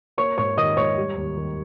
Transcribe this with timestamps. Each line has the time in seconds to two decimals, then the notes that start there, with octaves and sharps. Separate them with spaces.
0.17 A#3 C#5 C#6
0.38 G#2 C#5 C#6
0.57 D#3 D#5 D#6
0.77 G#2 C#5 C#6
0.98 G3
1.16 D#2
1.37 D#3